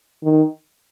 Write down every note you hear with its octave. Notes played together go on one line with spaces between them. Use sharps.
D#3